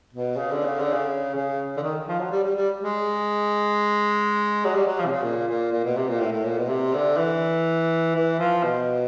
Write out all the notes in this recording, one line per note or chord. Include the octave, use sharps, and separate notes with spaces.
B2
C#3
D3
C#3
D3
C#3
C#3
D3
D#3
F3
F#3
G3
G3
G3
G#3
F#3
G3
F#3
F3
C3
C#3
A#2
A#2
A#2
B2
C3
A#2
A2
A2
A#2
B2
C3
D3
E3
E3
F3
B2